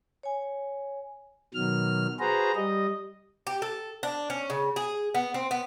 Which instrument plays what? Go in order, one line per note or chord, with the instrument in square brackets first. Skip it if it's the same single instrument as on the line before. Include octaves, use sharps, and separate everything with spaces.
[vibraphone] C#5 G#5
[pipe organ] B2 D#3 F#3 F6
F#4 G#4 B4 C5 A#5
G3 D#5
[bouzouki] G4
A4
D4
C#4
C#3
G#4
B3
C4
B3